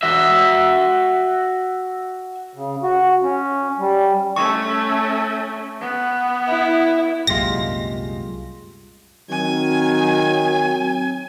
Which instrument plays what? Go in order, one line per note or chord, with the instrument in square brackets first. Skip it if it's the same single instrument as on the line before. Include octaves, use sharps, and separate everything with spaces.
[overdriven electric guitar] F#4 E5
[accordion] C#3
F#4
C#4
G3
[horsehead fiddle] A3 C#4 [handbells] C#6
[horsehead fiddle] B3
[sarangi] E4
[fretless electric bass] C2 F#2 A#2 [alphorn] G#3 [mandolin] F4 G4 [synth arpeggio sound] A#6
[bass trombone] D#3 [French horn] F#3 [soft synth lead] C4 [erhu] G#5